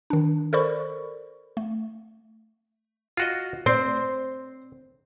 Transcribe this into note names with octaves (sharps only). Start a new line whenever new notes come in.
D#3 D4
A4 A#4 C5 D5 B5 C#6
A3
F4 F#4 D#5
C4 C5